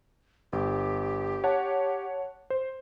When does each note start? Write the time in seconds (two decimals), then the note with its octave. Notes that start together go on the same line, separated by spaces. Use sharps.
0.53 G1 G4
1.44 C#5 F#5 A5
2.50 C5